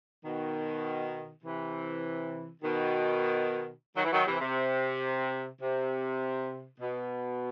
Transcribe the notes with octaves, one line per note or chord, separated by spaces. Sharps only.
B2 D#3
C3 E3
B2 D#3
D#3 F#3
E3
D#3 F#3
C3 E3
C3
C3
B2